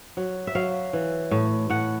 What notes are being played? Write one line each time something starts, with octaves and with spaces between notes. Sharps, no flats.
F#3
E5
F#3 F5
E3
A2
A2 F#5